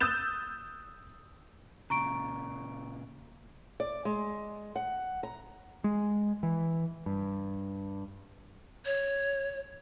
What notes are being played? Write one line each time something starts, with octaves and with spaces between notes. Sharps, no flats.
D#6 E6 F#6 G6 A6 E7
A#2 C#3 A#5 C#6 D7
D5
G#3
F#5
A#5
G#3
E3
G2
C#5